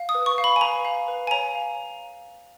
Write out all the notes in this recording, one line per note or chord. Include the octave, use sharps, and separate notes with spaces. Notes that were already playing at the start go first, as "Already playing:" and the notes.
Already playing: F5
D#6
B4
C#6
F5
B5
G#5
B4 A#5
F5
B4
G#5
C#5 A#5
F5